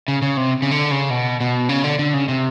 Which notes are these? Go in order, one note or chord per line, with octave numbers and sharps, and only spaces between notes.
C#3
C#3
C3
C#3
D3
C#3
B2
B2
C#3
D3
D3
C#3
C3